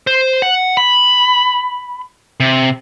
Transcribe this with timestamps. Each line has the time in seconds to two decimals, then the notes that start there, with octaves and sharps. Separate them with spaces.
0.07 C5
0.42 F#5
0.77 B5
2.40 C3